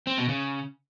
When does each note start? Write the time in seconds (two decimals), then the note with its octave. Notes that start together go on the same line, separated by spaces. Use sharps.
0.07 C4
0.18 B2
0.29 C#3